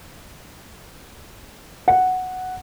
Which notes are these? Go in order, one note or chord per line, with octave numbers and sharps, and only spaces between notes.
F#5